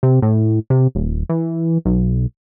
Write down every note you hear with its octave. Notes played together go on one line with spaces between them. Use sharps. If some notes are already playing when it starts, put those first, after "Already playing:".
C3
A2
C3
D#1
E3
B1